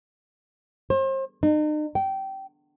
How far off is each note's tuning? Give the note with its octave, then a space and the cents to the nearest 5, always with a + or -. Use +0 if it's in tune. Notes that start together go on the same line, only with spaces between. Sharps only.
C5 +35
D#4 -40
G5 -20